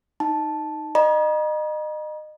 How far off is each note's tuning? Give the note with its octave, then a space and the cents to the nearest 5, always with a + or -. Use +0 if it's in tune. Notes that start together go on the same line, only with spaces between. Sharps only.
D#4 +0 A5 -10
D#5 -30 A#5 +40